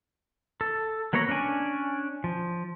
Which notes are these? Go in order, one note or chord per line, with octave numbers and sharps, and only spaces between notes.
A4
F#3 A#3 B3 C#5 A#5
C#4 D4 D5 G#5
F3